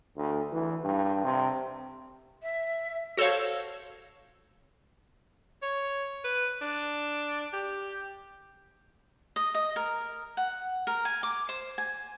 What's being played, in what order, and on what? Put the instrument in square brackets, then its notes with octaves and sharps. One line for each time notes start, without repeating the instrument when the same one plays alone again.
[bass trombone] D2
E3
G2
C3
[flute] E5
[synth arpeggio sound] F#4 A4 C5 C#5 F5
[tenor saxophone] C#5
B4
D4
G4
[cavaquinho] D#5
D#5
A#4
F#5
A#4
G#5
D6
C5
G#5